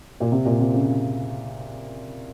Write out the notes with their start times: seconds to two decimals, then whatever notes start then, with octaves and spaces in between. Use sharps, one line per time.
0.20 A#2
0.32 C3
0.45 A#2
0.60 C3
0.74 C#3